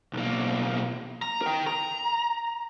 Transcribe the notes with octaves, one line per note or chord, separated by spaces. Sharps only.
B1 A#3
A#5
A#4 G5
A#5